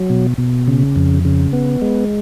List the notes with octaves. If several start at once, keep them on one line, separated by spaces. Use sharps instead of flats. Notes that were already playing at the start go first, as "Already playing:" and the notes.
Already playing: F#3
B2
B2
C#3
F2
C#3
B3
G#3